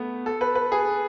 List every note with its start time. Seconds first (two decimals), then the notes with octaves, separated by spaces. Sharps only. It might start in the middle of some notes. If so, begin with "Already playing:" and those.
Already playing: A3 B3
0.26 A4
0.41 B4
0.55 B4
0.72 G#4